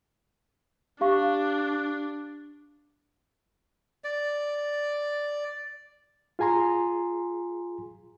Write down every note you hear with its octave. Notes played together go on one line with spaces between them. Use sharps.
D4 G4 F5 C#6
D5
F4 G#4 G#5 A#5 C6